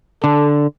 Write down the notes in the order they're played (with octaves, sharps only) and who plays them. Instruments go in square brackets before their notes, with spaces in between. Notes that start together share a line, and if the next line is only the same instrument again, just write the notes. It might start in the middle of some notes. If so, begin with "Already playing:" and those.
[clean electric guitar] D3 [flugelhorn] A4